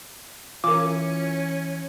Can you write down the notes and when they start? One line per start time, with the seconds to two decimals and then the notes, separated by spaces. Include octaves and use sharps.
0.64 E3 C#4 F4 A#4 G#5 D6